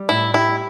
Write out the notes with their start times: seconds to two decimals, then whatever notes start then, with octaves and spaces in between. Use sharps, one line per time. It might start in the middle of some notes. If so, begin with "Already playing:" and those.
Already playing: G3
0.09 A2 E4
0.34 E4 G4